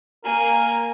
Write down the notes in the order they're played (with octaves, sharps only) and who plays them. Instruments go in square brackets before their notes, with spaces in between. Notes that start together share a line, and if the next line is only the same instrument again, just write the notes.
[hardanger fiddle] A#3 G#5 [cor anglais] A#4